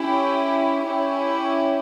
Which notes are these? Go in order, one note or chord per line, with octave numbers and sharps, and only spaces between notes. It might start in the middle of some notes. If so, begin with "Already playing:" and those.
Already playing: C#4 E4 G4
C#4 E4 G4